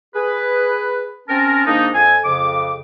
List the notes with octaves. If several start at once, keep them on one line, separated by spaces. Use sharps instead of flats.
G#4 B4
C4 C#4 A#4 A5
G#2 D#3 A#3 D4 D#4
F2 A4 G#5
F2 C#3 D6